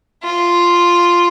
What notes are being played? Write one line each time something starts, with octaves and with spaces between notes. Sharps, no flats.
F4